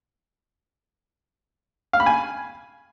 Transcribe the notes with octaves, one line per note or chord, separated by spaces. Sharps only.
F5
B5
G#5